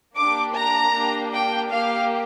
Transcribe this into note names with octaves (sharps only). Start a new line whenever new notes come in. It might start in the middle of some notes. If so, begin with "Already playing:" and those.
A#3 D4 G4 D6
A#5
A#3 D4 G4
G5
A#3 G4 F5